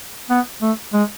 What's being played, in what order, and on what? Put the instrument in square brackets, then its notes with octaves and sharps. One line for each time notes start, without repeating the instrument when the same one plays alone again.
[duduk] B3
A3
G#3